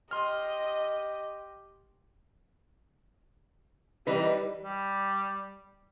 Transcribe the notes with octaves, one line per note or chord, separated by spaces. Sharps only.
G4 D#5 C6 F6
E3 G3 D#4 B4
G3